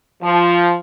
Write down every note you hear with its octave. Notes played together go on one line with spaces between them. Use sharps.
F3